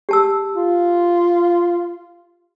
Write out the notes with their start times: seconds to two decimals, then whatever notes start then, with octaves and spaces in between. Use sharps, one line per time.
0.09 G4 A5 E6
0.54 F4